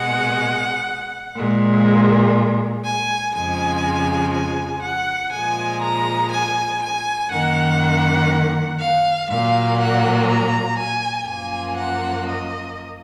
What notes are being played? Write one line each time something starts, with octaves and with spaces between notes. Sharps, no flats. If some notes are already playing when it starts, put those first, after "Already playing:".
Already playing: B2 G#3 F#5
A#2 G#3
G#5
F2 C#3 F3 G#3 G#5
G#5
F#5
A#2 F3 G#3 G#5
A#5
G#5
G#5
F#2 D#3 A#3 F#5
F5
A#2 F#3 A#3 F5
F#5
A#5
G#5
F#2 F3 A#3 G#5
F#5
D#5